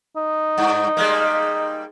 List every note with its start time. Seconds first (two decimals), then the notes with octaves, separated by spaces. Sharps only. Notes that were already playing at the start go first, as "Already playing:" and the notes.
0.16 D#4
0.58 G2
0.97 G3 G#3 A#3